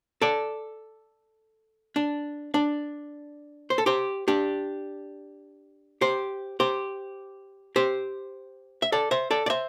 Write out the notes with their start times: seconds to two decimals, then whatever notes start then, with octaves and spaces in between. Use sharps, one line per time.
0.22 A4 D5
1.96 D4
2.54 D4
3.70 C5
3.78 A4
3.86 G4 C5
4.28 D4 G4
6.01 G4 C5
6.60 G4 C5
7.76 G4 C5
8.82 E5
8.92 A4 D5
9.11 C5 E5
9.31 A4 D5
9.46 D5
9.50 C5 E5